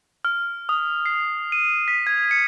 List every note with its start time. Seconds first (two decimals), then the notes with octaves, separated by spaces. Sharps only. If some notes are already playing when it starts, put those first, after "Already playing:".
0.25 F6
0.69 D#6
1.06 C7
1.52 D#7
1.88 B6
2.07 G#6
2.31 C#7